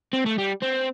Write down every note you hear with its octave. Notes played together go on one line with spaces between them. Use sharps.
C4
A3
G3
C4